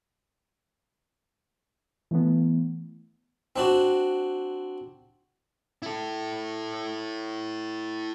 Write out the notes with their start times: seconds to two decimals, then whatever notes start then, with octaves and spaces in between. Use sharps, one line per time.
2.11 E3 A3 B3
3.56 C4 D4 F#4
5.82 E4 A4